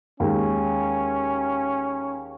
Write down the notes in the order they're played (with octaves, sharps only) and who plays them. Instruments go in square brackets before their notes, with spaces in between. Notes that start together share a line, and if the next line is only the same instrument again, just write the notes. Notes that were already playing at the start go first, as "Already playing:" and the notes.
[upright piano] D#2 G#3 [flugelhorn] C#4